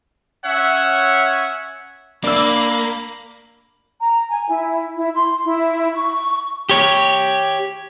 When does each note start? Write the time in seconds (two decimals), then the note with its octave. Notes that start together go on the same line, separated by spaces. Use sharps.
0.45 C#4 C#5 E5 F#5
2.24 A#3 D4 B5 E6
4.00 A#5
4.30 G#5
4.48 E4
4.96 E4
5.15 C6
5.44 E4
5.94 C#6
6.69 G4 C#5